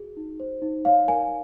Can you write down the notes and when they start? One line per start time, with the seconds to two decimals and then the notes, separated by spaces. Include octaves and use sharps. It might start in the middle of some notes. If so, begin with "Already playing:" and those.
Already playing: F#4 G#4
0.17 D#4
0.40 C5
0.62 D#4
0.85 C#5 F5
1.08 A#4 G#5